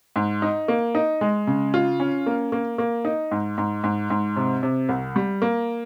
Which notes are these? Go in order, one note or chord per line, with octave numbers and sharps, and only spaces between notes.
G#2
D#4
A#3
D#4
G#3
C#3
F4
C#4
A#3
A#3
A#3
D#4
G#2
G#2
G#2
G#2
C3
C3
C2
G3
A#3